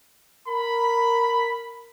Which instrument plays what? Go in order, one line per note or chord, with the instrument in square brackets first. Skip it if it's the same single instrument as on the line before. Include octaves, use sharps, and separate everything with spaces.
[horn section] A#4 B5